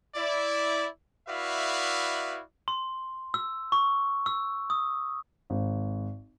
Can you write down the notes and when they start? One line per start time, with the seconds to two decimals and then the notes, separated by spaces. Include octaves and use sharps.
0.15 E4 D5
1.28 E4 F#4 B4 D5 E5 F5
2.68 C6
3.34 E6
3.72 C#6
4.26 E6
4.70 D#6
5.50 G#1